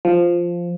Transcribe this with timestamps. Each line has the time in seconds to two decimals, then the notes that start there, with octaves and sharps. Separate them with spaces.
0.05 F3